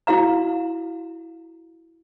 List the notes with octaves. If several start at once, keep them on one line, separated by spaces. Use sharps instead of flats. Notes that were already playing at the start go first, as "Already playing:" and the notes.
E4 F#4 F5 A#5